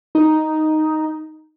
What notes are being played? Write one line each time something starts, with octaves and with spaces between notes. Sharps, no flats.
D#4